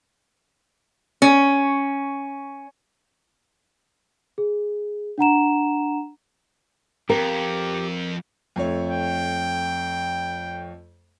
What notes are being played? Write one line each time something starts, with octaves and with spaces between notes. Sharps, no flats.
C#4
G#4
D4 F#5 A#5 E7
F2 G4 A#4
F2 A3 C#5
G5